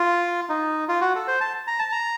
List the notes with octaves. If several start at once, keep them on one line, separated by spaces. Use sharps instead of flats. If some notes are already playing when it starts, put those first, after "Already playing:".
Already playing: F4
D#4
F4
F#4
A4
C5
A5
A#5
A5
A#5